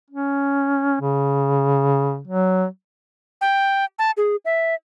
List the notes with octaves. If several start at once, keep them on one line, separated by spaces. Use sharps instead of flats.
C#4
C#3
F#3
G5
A5
G#4
E5